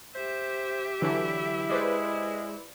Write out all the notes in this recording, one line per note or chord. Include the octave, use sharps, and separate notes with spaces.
G4 C5 E5
D3 E3 F#3 E4
G#3 B4 C5 D5